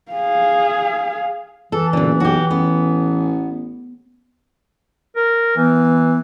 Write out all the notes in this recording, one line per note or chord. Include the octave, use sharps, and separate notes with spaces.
G#4 F5
E3 A4
F#1 A#2 D3
B1 F#4 G4
A1 B3
A#4
E3 B3